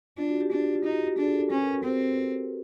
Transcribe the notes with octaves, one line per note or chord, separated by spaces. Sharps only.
D4 F4
F#4
G4
D4
F4
D#4
F#4
G4
D4 G#4
A4
C#4 B4
A4
A#4
F#4
C4 G4